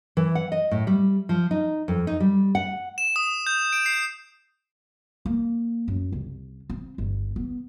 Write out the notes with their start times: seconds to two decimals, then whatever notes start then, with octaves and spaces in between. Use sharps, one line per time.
0.17 E3
0.35 F#5
0.52 D#5
0.71 A2
0.87 G3
1.29 F3
1.51 D#4
1.88 F2
2.07 D#4
2.20 G3
2.55 F#5
2.98 E7
3.16 D#6
3.47 G6
3.73 D7
3.86 C7
5.26 A#3
5.88 F#2
6.12 C2
6.70 C4
6.98 G1
7.36 B3